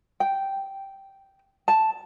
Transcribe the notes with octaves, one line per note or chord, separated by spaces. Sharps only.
G5
A5